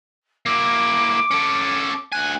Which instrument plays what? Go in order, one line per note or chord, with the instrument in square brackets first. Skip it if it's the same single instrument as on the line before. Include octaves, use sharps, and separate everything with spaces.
[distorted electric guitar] A#3 E4 [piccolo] D6
[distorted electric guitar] C#4 A4
[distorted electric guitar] D2 G#5 [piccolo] F#6